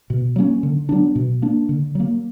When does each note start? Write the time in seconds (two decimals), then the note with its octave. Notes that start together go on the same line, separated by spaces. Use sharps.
0.10 B2
0.36 F#3 A#3 C#4
0.63 D3
0.89 F#3 B3 D4
1.15 B2
1.42 A#3 D4
1.69 D3
1.95 F#3 A#3